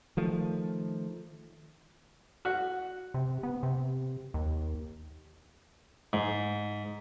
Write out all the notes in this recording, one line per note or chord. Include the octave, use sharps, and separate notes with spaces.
D#3 F3 A3
F#4
C3
B3
C3
D#2
G#2